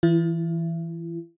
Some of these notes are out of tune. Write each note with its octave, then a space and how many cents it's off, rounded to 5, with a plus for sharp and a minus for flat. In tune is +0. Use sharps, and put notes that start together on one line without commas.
E3 +0 E4 +40